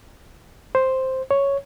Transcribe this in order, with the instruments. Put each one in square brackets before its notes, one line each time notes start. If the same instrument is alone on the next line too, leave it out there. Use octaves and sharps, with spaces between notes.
[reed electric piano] C5
C#5